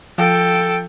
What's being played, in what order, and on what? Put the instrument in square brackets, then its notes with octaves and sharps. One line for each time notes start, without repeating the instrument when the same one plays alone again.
[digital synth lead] F3 [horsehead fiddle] A4 G5